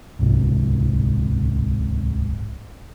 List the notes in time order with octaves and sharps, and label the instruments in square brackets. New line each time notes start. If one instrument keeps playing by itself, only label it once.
[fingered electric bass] D1 C2 G#2 C3